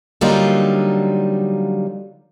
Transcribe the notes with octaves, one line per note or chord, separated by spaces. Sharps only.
D3 F#3 G3 A#3 D#4 F4